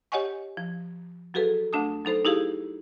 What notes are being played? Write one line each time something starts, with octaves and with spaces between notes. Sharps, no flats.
G4 C#5 D#5 F#5 G#5 C#6
F3
F#3 F#4 G#4 A4 B4
D2 A3 D4 A5 D#6
F#3 D#4 A4 C5
D#4 E4 G4 G#4 F5